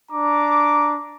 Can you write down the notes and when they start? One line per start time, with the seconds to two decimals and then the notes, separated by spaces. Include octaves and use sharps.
0.11 D4 A#5 D6